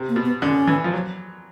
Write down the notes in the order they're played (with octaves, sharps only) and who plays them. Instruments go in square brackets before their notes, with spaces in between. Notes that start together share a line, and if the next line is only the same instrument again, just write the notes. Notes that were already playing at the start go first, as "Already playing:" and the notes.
Already playing: [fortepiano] C3
[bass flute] A#3
[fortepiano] B2
[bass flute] B3
[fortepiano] D3 [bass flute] C#4
[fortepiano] E3
F3
F#3